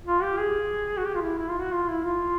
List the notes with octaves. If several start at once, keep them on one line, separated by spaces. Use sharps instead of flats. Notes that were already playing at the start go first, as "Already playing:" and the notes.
F4
G4
G#4
F#4
G4
F4
E4
E4
F4
F#4
F4
E4
F4